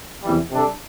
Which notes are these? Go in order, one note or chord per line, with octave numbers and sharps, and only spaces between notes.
E2 C3 E3 G3
C3 G3 D4 A4